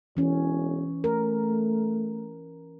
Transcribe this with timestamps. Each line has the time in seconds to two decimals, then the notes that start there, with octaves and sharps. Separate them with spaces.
0.17 E1 E3 C#4
1.04 A3 A#4